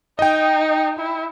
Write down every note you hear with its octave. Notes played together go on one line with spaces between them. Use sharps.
D#4 D#5 G5
E4